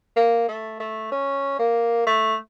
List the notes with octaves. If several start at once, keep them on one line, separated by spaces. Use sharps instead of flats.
A#3
A3
A3
C#4
A#3
A3